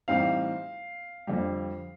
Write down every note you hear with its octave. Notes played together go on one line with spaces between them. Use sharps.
A2 E3 G3 C4 D#4 F5
F2 D3 G3